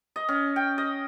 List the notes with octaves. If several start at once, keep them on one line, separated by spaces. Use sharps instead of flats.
D#5
C#4
G5
D#5